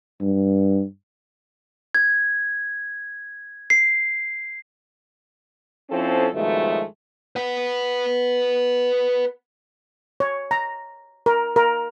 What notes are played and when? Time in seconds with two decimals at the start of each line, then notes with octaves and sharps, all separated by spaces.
0.21 G2
1.95 G#6
3.70 C7
5.90 F3 C4 C#4 E4 A4
6.33 G2 B2 D#3 F3 G#3 A3
7.36 B4 F#5
10.20 C#5
10.51 A#5
11.26 A#4
11.56 A#4